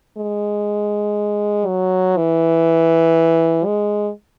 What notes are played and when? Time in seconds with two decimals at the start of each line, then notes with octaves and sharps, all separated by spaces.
0.18 G#3
1.67 F#3
2.17 E3
3.65 G#3